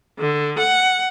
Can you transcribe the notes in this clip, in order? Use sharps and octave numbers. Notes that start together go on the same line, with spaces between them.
D3
F#5